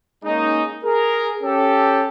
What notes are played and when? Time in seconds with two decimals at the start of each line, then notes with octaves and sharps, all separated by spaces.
0.25 G#3 A#3 C#4 D#4
0.84 G#4 A#4
1.43 C#4 G4 A4